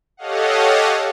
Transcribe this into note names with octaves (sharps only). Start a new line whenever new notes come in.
G4 A4 C#5 D#5 F5 F#5